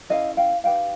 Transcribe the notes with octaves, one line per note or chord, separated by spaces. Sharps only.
C#4 E4 A4 D#5 F5
F5 G5
D#4 G4 B4 F5 G5